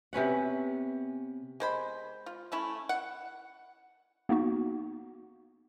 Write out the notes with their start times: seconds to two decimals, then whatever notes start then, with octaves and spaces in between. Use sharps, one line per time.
0.13 C3 B3 C#4 F#5
1.60 G#3 C5 B5
2.26 F4
2.52 A3 C#4 E4
2.89 F#5
4.29 A#3 B3 D#4 F#4